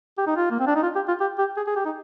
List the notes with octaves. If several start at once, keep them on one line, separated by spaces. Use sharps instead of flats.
G4
D#4
F4
A#3
C4
D4
D#4
F4
G4
F4
G4
G4
G#4
G#4
G4
D#4